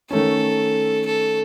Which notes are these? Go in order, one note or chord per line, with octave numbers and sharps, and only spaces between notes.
D#3 A3 C#4 A4
A4